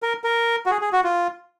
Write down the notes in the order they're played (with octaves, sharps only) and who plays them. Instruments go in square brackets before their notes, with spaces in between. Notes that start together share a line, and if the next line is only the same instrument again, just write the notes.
[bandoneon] A#4
A#4
F#4
G#4
G#4
F#4
F4